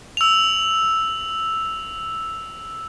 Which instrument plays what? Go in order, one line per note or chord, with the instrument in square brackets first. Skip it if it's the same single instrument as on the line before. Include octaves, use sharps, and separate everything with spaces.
[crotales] E6 F7